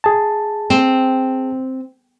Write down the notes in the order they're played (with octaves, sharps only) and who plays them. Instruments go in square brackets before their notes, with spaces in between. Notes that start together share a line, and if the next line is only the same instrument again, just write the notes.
[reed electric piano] G#4 A5
[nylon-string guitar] C4